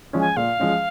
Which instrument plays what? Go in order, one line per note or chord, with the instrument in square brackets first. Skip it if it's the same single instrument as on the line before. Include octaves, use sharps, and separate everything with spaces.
[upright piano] F3 G#3 C#4
[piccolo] G#5
[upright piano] A#2 [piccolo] F5
[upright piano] F3 G#3 C#4